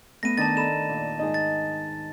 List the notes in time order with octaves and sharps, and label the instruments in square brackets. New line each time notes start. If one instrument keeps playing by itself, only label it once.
[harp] A3 B3 [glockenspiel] A#6 D#7
[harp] D#3 D4 [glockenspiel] A5 A6
[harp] A4 A#5 B5 [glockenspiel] E7
[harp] A#2
G#2 D#4 D#5
[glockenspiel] A6